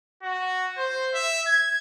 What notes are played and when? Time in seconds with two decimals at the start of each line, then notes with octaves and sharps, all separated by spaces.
0.23 F#4
0.77 C5
1.14 E5
1.47 G#6